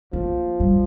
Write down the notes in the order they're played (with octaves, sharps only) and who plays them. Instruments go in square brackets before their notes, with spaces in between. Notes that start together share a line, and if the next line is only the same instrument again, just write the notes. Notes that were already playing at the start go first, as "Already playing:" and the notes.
[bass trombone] F3 [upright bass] A#3
[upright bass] G3